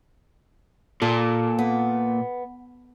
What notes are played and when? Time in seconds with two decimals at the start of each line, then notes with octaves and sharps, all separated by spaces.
1.02 A#2 A4
1.59 B3